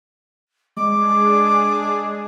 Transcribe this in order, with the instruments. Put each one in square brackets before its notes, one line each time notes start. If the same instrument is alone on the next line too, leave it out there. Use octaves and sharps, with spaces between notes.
[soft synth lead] G#3 [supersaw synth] D4 G#4 [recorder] D6